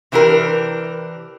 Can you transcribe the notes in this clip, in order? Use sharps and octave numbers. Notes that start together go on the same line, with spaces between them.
C3 E3 D4 G4 A#4